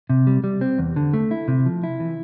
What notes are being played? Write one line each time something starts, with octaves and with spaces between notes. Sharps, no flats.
C3
G3
G3
C4
E2
D3
A3
E4
C3
F3
E4
E3